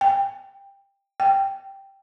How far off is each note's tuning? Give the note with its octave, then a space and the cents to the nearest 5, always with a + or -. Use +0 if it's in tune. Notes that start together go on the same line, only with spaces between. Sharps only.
G5 +15
G5 -5